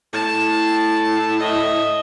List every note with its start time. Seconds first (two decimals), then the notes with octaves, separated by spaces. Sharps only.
0.14 A2 A5
1.39 D#5 E5